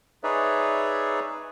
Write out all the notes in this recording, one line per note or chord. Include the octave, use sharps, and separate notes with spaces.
D#4 G#4 B4 C#5 D5 E5